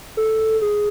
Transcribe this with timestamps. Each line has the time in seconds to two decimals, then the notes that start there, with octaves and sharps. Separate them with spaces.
0.17 A4
0.62 G#4